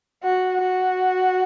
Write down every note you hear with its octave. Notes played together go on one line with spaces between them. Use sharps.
F#4
F#4